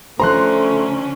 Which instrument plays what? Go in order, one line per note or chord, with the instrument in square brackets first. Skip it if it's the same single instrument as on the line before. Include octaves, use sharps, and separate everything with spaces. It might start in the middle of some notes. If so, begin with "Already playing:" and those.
[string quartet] D3 C#4 [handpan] F3 C5 [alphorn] A3 [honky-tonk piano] A#5 C6 F#6